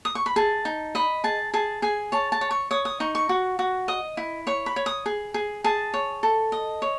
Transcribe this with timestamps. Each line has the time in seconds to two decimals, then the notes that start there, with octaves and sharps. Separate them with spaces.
0.05 D#6
0.15 C#6
0.26 B5
0.36 G#4 A5
0.65 D#4
0.95 D#5 B5
1.24 G#4 A5
1.54 G#4 A5
1.82 G#4 G#5
2.12 C#5 A5
2.32 A5
2.41 C#5
2.51 C#6
2.71 C#5 D#6
2.85 D#6
3.00 D#4 C#6
3.15 C#6
3.29 F#4
3.59 F#4
3.88 D#5 D#6
4.17 E4
4.47 C#5 C#6
4.66 B5
4.76 C#5
4.86 D#6
5.06 G#4
5.34 G#4
5.64 G#4 A5
5.94 C#5
6.23 A4
6.52 D#5
6.82 C#5